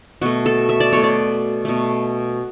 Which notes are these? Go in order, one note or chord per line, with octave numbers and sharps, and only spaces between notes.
B2 A3 F#4
A4
E5
D5
B2 A3 C#5
D5
B2 A3